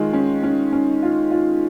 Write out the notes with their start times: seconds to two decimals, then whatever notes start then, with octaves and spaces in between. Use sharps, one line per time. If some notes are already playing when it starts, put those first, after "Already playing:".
Already playing: D#3 G#3 F4
0.13 C#4
0.43 C#4
0.72 C#4
1.03 F4
1.31 F4